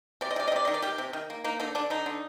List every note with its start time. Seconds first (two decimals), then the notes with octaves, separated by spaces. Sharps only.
0.21 C3 D5
0.31 D#5
0.36 C3 D5
0.48 D#5
0.52 C3 D5
0.65 D#3 D#5
0.74 D5
0.82 D#3 G4
0.98 C3
1.13 D#3
1.30 A#3
1.44 A#3 D#4
1.60 D3 D#4
1.75 D3 D4
1.90 D3 D#4
2.06 D3